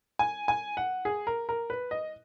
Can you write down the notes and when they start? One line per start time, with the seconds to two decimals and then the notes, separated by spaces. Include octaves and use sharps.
0.19 G#5
0.48 G#5
0.77 F#5
1.05 G#4
1.27 A#4
1.49 A#4
1.70 B4
1.91 D#5